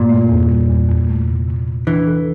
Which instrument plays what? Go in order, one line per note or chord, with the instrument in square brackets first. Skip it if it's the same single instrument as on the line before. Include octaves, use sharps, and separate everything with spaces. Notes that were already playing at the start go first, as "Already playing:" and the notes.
Already playing: [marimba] G2 [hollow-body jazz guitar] A#2
[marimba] A3
E2
G3
E2
E2
A3
C3
C3
C3
[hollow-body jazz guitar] E3 [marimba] D4
[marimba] A4